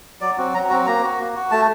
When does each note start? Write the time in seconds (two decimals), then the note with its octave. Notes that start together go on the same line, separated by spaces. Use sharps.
0.21 F#3 D5
0.38 C4 F#4
0.54 F#3 A#5
0.70 C4 F#4 A#5
0.86 A#3 A#5
1.03 F#4
1.19 A#3
1.35 F#4
1.51 A3 A5